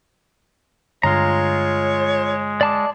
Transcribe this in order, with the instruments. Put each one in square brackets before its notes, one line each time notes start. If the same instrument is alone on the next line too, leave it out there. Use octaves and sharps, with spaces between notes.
[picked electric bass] G2 D3 [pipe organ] G#3 [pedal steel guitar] F4 A#5 [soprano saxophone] C#5
[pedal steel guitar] D5 A5 D6